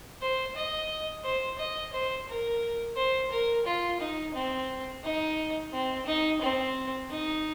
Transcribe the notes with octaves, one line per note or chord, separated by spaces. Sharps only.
C5
D#5
C5
D#5
C5
A#4
C5
A#4
F4
D#4
C4
D#4
C4
D#4
C4
D#4